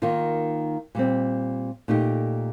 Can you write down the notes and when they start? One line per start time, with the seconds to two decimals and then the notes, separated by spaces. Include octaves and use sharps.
0.02 D#3 A#3 F4
0.95 A#2 G3 C4
1.88 A#2 A3 D#4 G4